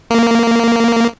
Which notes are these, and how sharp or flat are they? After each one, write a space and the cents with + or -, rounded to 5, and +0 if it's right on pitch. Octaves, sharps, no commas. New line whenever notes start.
A#3 -10